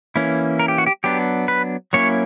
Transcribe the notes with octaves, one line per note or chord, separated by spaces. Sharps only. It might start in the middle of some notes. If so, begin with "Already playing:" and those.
E3 A#3 C#4 E4
A#4
G4
F#4
G4
F#3 B3 D4 G4
B4
F#3 A#3 C#4 E4 C#5